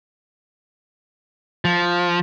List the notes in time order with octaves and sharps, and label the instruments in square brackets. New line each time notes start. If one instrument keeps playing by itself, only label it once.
[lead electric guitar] F3